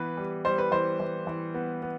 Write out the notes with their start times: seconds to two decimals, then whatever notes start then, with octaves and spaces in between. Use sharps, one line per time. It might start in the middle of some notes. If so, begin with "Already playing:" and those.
Already playing: E3 B3 B4
0.17 G3
0.45 G3 C5
0.58 B4
0.71 E3 C5
1.00 E3
1.27 E3
1.54 B3
1.82 B3